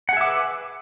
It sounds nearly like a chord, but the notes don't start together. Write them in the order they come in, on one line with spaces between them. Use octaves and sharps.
F#5 G#4 E5 D6 B4